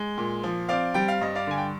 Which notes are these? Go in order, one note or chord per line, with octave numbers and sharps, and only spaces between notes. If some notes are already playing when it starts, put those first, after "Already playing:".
Already playing: G#3
A#2
F3
C4 D5 F5
G3 G5
F5
G2 D#5
D5 F5
D3 G#5
G5